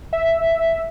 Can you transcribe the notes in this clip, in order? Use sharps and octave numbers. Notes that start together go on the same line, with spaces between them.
E5